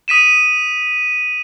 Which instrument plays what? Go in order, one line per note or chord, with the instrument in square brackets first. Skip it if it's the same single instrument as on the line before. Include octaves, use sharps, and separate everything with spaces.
[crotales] D#6 B6 D#7 E7